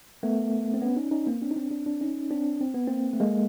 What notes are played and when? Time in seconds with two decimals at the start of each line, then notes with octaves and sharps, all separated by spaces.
0.23 A3 B3
0.74 C4
0.81 B3 C#4
0.96 C#4 D#4
1.11 C#4 D#4
1.26 A#3 C4
1.42 C4 D4
1.51 D#4
1.56 C4 D4
1.71 C4 D4
1.86 C4 D4
2.01 C#4 D#4
2.31 C4 D4
2.61 C4
2.74 B3
2.88 A#3 C4
3.13 A3
3.20 G#3 A#3